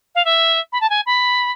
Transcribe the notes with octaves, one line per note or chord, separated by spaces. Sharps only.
F5
E5
B5
A5
G#5
B5